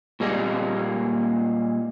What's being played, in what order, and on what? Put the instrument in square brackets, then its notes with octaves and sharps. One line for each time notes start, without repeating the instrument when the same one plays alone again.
[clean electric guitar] A#2 G3 G#3 A#3